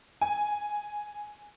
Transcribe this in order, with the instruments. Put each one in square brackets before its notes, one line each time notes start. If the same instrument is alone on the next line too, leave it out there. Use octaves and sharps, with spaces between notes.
[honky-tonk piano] G#5